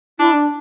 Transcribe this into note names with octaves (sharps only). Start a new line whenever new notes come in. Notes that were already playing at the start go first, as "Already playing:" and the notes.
D4 E4
D4